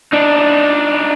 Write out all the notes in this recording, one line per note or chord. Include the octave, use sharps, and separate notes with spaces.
D4 D#4